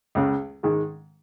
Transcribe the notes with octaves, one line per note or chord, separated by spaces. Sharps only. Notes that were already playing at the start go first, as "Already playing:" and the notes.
C#2 C#3 G#3
G#2 D#3 G#3